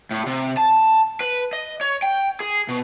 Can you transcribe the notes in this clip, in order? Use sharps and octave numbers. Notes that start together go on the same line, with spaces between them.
A2
C3
A5
B4
D#5
C#5
G5
G#4
B2